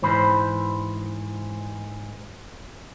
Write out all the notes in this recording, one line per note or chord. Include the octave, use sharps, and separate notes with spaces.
G#2 E3 C5 B5